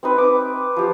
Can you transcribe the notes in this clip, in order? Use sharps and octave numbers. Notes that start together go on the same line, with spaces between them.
C4 D#4 B4
D6
F3 G4